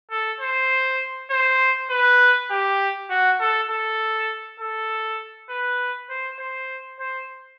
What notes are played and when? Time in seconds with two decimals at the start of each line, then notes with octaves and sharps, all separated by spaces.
0.11 A4
0.40 C5
1.31 C5
1.90 B4
2.51 G4
3.10 F#4
3.40 A4
3.70 A4
4.60 A4
5.50 B4
6.10 C5
6.39 C5
7.00 C5